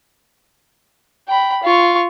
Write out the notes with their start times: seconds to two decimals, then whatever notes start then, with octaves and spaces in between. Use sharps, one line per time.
1.28 G5 B5
1.64 F4 C#6